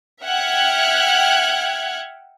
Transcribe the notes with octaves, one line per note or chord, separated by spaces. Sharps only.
E5 F#5 G5 F6 F#6 G#6